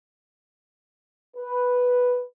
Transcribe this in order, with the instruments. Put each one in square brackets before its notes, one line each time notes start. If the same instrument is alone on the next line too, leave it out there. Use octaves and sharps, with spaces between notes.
[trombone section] B4